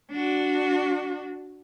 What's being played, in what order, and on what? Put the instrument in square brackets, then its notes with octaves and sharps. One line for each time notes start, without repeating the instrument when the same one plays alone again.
[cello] D4 F#4